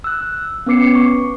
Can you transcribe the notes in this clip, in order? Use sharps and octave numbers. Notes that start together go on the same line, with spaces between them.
E6 F#6
B3 C#4 B4 D6 C7 C#7
C#6